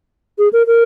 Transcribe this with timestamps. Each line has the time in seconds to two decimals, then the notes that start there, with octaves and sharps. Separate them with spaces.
0.39 G#4
0.53 A#4
0.67 A#4